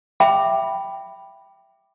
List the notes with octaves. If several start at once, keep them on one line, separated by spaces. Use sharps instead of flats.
E5 G5 B5 D6